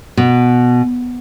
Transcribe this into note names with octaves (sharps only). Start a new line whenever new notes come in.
B2